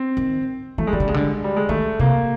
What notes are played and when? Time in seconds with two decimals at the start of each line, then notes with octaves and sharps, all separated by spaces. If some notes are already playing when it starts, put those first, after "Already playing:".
Already playing: C4
0.17 D#3
0.78 E3 A3
0.87 G#3
0.93 D#3 G3
1.00 D3
1.08 C#3 G#3
1.14 D3
1.44 G3
1.56 G#3
1.69 D#3 A3
2.00 C3 A#3